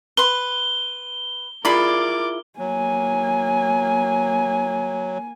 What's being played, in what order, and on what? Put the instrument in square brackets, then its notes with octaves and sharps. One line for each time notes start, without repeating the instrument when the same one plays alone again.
[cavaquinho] B4 C6 [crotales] G7
[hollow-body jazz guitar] E4 F4 G#4 [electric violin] A#4 D6 [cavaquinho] D5 B5
[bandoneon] F#3 [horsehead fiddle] A#3 G#5